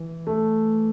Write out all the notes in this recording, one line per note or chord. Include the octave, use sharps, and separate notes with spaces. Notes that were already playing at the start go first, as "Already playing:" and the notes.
Already playing: E3
A3